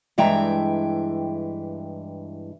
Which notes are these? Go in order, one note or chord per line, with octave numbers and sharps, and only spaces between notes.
G2 E3 G#3 E5 G5 A#5